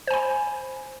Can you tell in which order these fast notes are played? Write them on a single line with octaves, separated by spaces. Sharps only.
C5 G#5 B5